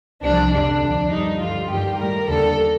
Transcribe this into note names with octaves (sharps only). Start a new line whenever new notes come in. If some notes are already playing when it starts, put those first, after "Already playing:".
C2 C3 F3 D4
F2 D3 G3 D4
D2 D3 F3
G2 D#3 G3 D#4
G2 D3 G3 F4
G2 D#3 G3 G4
A2 G3 A#4
D#2 D3 G3 A4